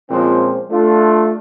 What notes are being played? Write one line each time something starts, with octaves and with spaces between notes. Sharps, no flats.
A#2 F3 G#3 C4 C#4 C5
A3 D4 F4